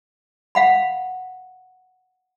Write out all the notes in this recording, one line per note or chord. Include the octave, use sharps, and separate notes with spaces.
F5 F#5 B5